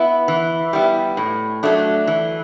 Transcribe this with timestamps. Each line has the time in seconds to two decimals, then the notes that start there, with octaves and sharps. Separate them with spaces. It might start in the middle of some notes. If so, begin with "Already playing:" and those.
Already playing: B3 E4
0.28 E3
0.73 G3 B3 E4
1.17 A2
1.63 F#3 A3 D4
2.07 E3